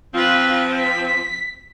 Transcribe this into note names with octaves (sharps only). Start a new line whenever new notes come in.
F3 C4 F4 B4
B6